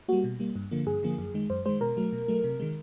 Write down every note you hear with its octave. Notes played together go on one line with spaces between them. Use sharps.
G3 A#3 F#4
B2
G3 A#3
G2
D3 F3 A#3
G2 G#4
D3 F3 A#3
F#2
D#3 G#3
F#2 C5
D#3 G#3 C5
B2 A#4
F#3 A3
B2
F#3 A3
C3
D#3 G#3